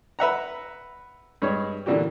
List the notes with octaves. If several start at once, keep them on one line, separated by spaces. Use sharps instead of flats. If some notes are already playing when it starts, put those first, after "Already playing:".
B4 E5 F#5 A#5
G2 G#3 C#5
A#2 D3 E3 D4 F#4 G4